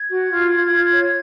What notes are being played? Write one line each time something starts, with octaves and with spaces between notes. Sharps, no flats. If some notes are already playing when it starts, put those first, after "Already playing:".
Already playing: G#6
F#4
F4
F4
F4
C#5